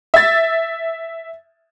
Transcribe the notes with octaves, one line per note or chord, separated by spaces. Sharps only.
E5 A6